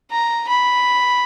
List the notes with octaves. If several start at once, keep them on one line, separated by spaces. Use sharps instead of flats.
A#5
B5